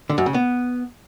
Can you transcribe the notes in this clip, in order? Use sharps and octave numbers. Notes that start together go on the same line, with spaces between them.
D3
F#2
C#3
B3